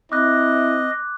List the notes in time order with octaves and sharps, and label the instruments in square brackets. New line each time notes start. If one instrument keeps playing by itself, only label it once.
[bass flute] C4 [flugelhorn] E4 [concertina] D#5 [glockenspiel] D6 F#6